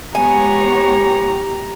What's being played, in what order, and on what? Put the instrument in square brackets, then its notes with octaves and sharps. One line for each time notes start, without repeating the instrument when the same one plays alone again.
[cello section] G#3 B3 C#5 [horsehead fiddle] G4 A#5 [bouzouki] G#5